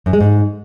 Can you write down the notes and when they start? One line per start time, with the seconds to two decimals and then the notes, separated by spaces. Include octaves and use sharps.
0.06 F#2
0.13 G#3
0.21 G#2